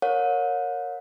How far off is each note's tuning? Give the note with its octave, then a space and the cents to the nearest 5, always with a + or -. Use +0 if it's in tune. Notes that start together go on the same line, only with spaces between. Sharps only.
A#4 +0 C#5 +0 F#5 -45